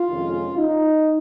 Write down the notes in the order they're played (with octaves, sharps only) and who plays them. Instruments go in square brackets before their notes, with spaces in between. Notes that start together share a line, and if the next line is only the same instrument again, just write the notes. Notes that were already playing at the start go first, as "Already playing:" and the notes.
Already playing: [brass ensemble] F4
F2 C3 D#3 G#3 C#4
D#4